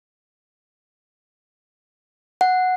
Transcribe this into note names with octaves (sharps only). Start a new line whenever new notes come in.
F#5